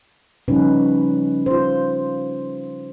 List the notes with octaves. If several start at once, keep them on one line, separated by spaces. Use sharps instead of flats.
C#3 F3 G3 C#4 D#4 B4
F4 C5